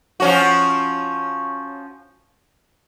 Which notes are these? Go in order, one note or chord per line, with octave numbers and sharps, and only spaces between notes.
F3 C#4 F#4